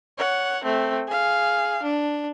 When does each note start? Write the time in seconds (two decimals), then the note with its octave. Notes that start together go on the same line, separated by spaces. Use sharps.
0.18 C#5 F#5
0.64 A3 C4
1.07 G#4 F5
1.83 D4